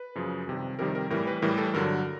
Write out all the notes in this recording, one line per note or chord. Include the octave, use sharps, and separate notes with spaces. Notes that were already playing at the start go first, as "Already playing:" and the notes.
Already playing: B4
F#2 C#3 F3
F2 C3 D#3 G3
F2 C3 D#3 G3 A#4
A#4
A2 E3 G3 A#4
B4
A2 E3 G3 A#4
A4
G2 D3 F#3 A#4